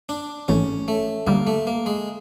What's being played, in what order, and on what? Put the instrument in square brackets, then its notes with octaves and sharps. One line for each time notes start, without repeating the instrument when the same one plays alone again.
[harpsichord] D4
[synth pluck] A1 G#2 E3 A3 [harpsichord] C#4
[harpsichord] A3
[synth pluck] D2 D3 G3 [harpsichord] A#3
[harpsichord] A3
A#3
G#3